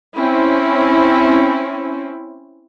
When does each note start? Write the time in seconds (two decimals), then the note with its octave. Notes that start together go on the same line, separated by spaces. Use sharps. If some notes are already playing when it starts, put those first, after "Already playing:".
0.18 C4 C#4 E4